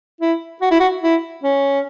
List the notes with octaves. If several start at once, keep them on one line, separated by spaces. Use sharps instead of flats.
E4
F#4
E4
F#4
E4
C#4